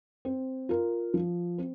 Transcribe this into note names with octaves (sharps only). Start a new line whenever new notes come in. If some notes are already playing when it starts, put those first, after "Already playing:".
C4
F4 A#4
F3
C4